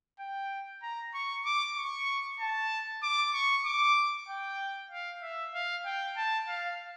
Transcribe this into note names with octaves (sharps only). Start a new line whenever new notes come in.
G5
A#5
C#6
D6
C#6
A5
D6
C#6
D6
G5
F5
E5
F5
G5
A5
F5